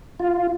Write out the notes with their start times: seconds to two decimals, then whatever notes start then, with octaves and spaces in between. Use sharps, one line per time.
0.20 F4